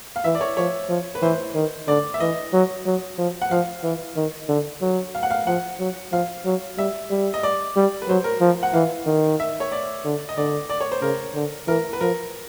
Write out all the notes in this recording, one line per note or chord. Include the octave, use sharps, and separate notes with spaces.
F5
E3 E5
D5
C#5
F3 C#5
F3
B4
E3 C5
D#3
D3 D5
E5
E3 D#5
F#3
F#3
F3
F#5
F3 F5
E3
D#3
D3
F#3
F5
F#5
F5
F3 F#5
F#3
F3 F5
F#3
G3 E5
G3
D#5
D5
G3
B4
F#3 C5
A#4
F3
F#5
E3 F5
D#3
E5
C#5
D5
D3
D#5
D3 D5
D5
C#5
C5
C#3 A#4
D3
E3 A#4
B4
F3 A#4